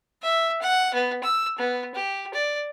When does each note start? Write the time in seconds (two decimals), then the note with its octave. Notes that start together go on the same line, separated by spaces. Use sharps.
0.22 E5
0.62 F#5
0.94 B3
1.23 E6
1.58 B3
1.95 G4
2.34 D5